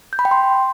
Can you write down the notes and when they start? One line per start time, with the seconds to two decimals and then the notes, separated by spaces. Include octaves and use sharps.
0.13 G6
0.19 B5
0.25 G5
0.31 C6